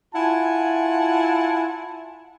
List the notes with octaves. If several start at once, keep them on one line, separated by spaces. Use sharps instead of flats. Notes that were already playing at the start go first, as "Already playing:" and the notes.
E4 F4 F#5 G#5 A5